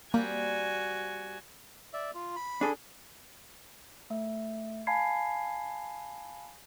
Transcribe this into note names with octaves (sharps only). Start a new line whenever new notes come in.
G3 A#3 C4 F#4 G#5
D5 E5
F4
B5
D4 G#4 A4
A3 E5
F5 G#5 A5 B5 G#6 C7